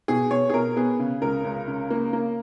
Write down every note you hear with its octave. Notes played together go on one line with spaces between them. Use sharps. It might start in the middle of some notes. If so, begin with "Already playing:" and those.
B2 G#4
B2 C#5
G#4
B2 A#4
B3 G#4
C#3
C#2 A#4
C#2
C#3
A#3
A#3